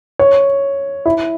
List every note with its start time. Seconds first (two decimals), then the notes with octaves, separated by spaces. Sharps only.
0.19 C#5
1.06 E4